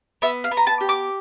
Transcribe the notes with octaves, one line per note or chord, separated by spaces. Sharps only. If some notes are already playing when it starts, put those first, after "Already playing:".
B3 E5
F5
B3
A#5
A5
G4
D6